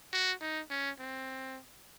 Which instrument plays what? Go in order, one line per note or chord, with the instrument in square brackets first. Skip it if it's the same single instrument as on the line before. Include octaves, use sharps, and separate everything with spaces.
[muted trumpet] F#4
D#4
C#4
C4